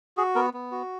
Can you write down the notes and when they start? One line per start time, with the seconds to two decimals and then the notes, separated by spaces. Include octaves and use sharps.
0.17 F#4 G#4
0.35 B3 A#4
0.54 B3
0.72 F#4